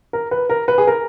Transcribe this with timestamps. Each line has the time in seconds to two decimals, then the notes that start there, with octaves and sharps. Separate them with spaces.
0.13 A#4
0.31 B4
0.50 A#4
0.68 B4
0.78 G#4
0.87 A#4